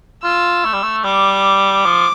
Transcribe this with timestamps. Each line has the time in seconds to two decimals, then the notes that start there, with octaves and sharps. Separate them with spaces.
0.23 F4 E6
0.65 A3
0.73 G3
0.83 A3
1.04 G3 D6
1.85 F3